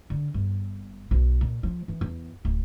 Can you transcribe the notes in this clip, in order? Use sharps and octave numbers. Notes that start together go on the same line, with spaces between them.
D3
G1
B1
A#2
F3
E3
E2
D1